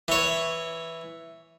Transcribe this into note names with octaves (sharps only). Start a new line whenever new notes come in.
E3 C#5